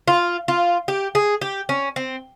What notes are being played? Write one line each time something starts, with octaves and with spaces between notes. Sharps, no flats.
F4
F4
G4
G#4
G4
C#4
C4